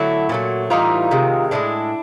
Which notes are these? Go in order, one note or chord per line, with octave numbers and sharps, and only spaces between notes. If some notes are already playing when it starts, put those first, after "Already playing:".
Already playing: D3 F#3 A3 E4 F#4
A#2 F#3 A3
A2 E3 G3 D#4 F4
C3 D#3 G#3
A2 F3 G#3 D4 E4